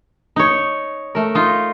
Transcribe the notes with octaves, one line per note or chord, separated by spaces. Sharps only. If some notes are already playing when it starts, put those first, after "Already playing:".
D#4 C#5
A3 A#4
D#4 F4